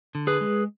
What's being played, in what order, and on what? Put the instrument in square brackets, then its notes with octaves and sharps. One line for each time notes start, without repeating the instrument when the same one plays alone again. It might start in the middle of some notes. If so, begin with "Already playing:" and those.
[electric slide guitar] D3
G#4 B4
G#3